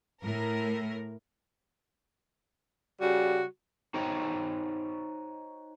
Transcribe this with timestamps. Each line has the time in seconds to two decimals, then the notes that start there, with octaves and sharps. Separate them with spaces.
0.21 A2 A#4
3.01 C#3 G3 F#4
3.94 D#4 F#4 C5 C#5 D#5 G5